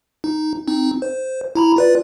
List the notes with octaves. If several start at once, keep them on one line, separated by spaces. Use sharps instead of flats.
D#4
C4 D#4
C5
E4 A#5 B5
F4 B4 D5